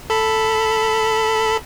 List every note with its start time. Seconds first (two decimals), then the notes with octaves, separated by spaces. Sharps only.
0.10 A4 B5